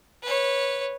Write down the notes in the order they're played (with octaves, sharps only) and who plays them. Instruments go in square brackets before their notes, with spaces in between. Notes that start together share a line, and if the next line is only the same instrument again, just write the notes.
[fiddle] B4 C#5